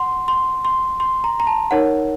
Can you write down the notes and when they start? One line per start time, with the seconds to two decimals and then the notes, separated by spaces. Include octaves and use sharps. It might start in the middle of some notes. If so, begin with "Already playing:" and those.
Already playing: F#5 C6
0.28 C6
0.65 C6
1.00 C6
1.24 A#5
1.40 A#5
1.47 A5
1.71 D#4 A#4 C#5 F#5